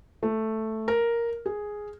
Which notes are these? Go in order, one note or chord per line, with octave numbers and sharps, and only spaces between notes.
A3
A#4
G#4